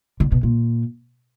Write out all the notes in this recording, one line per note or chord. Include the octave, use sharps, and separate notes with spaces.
D3
B2
A#2